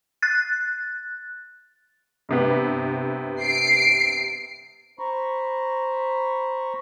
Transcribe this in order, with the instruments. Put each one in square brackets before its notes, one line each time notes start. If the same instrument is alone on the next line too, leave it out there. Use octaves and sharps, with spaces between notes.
[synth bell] F#6 A6
[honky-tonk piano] G2 C3 B3
[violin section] C7 D7
[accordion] C5 A#5 B5 C#6